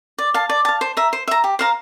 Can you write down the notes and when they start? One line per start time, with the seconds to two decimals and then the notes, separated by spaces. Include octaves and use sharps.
0.18 D5
0.34 F5 A5
0.49 D5
0.65 F5 A5
0.81 C5
0.97 E5 A#5
1.13 C5
1.28 E5 A#5
1.44 G4
1.59 C5 F5 A#5